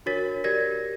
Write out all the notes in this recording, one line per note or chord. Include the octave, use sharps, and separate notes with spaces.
D4 F#4 A#4 C#5 A6 B6
G4 A#4 D5 G#6 A#6